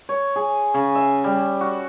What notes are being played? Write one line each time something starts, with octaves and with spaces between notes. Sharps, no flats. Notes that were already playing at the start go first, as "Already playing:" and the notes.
C#5
G#4
C#3
E5
G3
F#4